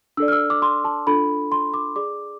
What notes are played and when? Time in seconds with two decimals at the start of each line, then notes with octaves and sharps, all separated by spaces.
0.17 D4 A4 D5 E6
0.28 F6
0.32 E6
0.50 D6
0.62 C6
0.85 A5
1.07 D4 F4 A4 B5
1.52 C6
1.74 D6
1.96 G#4 D5 D6